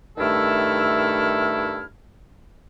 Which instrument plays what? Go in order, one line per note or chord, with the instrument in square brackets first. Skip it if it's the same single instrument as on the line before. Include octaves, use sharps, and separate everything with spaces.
[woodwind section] G2 D#3 A3 E4 A4 F6